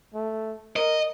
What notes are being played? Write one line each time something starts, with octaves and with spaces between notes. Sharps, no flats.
A3
A#4 D#5